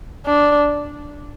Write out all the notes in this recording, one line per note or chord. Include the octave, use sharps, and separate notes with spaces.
D4